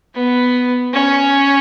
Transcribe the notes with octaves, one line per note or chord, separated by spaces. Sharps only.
B3
C#4